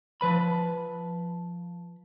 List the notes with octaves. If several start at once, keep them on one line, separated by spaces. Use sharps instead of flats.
F3 B4 B5